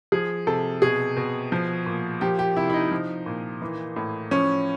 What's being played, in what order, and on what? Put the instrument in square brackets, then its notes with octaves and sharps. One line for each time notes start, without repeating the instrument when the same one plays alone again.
[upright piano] F3 G#4
C3 A4
B2 G#4
B2
F3
A#2
F3 G4
G4
C3 E4
E4
D#4
F3
A#2
E3
A2
F3 C#4